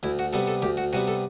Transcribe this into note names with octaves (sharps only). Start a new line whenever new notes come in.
D2 E4
F#4
C3 G3 B3 A4
A4
D2 G4
F#4
C3 G3 B3 F#4
A4